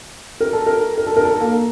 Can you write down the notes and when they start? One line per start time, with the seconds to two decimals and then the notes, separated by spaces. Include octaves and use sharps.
0.40 A#4
0.53 A4
0.66 A#4
0.97 A#4
1.07 A4
1.16 A#4
1.25 A4
1.41 A#3